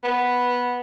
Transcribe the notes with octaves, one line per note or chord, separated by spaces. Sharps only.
B3